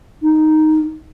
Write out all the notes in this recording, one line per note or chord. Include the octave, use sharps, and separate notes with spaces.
D#4